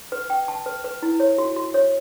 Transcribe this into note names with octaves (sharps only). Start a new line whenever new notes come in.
B4
G5
A5
B4
B4
E4
C#5
F#4
F#4
C#5